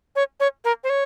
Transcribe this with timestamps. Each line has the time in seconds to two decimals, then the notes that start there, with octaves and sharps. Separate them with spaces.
0.16 C#5
0.40 C#5
0.65 A#4
0.84 C5
0.90 C#5